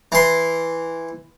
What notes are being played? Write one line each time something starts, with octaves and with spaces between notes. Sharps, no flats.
E3 C6